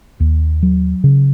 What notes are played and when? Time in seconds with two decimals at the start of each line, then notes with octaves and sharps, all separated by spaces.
0.20 D#2
0.63 F#3
1.04 C#3